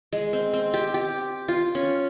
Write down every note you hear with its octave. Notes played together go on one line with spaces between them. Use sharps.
G#3
C4
C4
G4
G4
F4
C#4